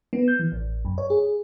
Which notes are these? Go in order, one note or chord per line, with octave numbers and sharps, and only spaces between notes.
B3
G6
E3
A1
F#2
C#5
G#4